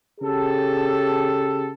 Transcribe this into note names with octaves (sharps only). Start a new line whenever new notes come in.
C#3 G4 A4